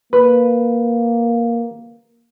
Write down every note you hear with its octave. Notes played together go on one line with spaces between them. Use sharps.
A#3 B4